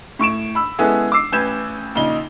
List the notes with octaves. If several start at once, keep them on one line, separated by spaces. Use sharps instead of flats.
A2 C#6 D7 E7
B5 E6
G#3 B3 C#4 E4 G#4 A4
D6 E6 C7
A1 C#4 B4 G6 G#6 E7
A#1 C#3 D#4 G7